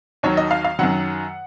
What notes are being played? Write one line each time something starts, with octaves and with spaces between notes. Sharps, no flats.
D#2 D#3 F#3 C#5
D#5
F5
F5
F#2 D#3 F#3 F#5